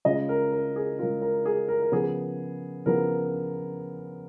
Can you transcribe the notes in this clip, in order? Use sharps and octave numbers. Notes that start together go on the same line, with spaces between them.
C#3 G#3 C#4 F4 D#5
A#4
A#4
G#4
C#3 G#3 C#4 F4 A#4
A#4
G#4
A#4
A#4
C#3 F3 B3 G#4
C#3 F3 B3 A#4